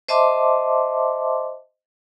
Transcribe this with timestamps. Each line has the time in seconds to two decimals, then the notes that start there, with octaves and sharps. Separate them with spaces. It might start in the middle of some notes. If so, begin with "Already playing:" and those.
0.08 C5 D#5 E5 A5 C6 D6